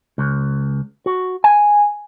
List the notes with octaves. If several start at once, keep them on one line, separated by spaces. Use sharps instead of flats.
C#2
F#4
G#5